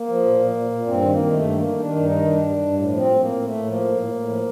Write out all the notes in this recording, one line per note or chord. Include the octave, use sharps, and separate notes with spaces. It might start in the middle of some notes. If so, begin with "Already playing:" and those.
Already playing: A#3
F3
A#2
A#2
A#2
A#2
G2 C4
D#3
A#3
D#3
G2 A3
D#3
A#3
D#3
D#3 D4
G2
D#4
D#3
G2 D4
G2
G2
A2
F3
C4
A2
A2 A#3
A2
A3
A2
F3 A#3
A2
A2
A2
F3